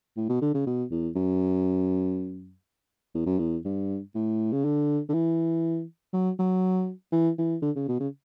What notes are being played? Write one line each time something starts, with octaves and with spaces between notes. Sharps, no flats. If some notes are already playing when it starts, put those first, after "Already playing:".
A2
B2
D3
C#3
B2
E2
F#2
E2
F#2
E2
G2
A2
C#3
D3
D3
E3
F#3
F#3
E3
E3
D3
C#3
B2
C#3